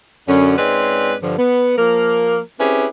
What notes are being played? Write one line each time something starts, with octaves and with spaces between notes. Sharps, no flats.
F#2 D3 C#4
G#2 G#3 C4 C#4 B4 D5
G2 D3 F3
B3
F3 A#3 A#4
C4 C#4 E4 G4 G#4 B4